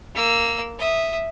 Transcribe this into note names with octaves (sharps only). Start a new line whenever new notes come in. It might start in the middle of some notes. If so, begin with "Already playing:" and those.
A#3 E6
E5 D#6